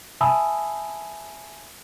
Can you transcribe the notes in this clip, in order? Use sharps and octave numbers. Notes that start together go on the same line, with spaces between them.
E5 G#5 A5 B5 D#6 E6